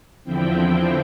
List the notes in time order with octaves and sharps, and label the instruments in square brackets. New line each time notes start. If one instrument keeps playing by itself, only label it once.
[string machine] E2 D3 F3 C4 E4 G5